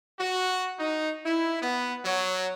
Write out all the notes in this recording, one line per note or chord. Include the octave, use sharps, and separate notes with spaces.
F#4
D#4
E4
B3
F#3